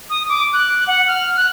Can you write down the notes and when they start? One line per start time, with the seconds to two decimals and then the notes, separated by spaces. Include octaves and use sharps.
0.10 D#6
0.29 D6
0.53 F#6
0.87 F#5
1.07 F6
1.37 F#6